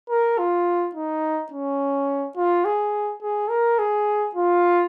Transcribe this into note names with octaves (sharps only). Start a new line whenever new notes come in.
A#4
F4
D#4
C#4
F4
G#4
G#4
A#4
G#4
F4